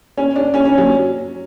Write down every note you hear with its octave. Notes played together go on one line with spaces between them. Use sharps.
C#4
D4
C#4
C#4
F#3